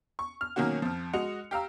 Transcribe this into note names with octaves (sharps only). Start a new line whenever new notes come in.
C#6
F6
B2 D#3 F#3 A#3 C#4 F#4
F2 F3
G#3 F#4 D#5 C#7 F7
G4 F5 A#5 E6